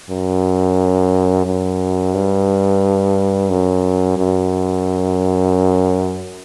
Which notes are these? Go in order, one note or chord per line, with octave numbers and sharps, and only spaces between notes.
F#2
F#2
G2
F#2
F#2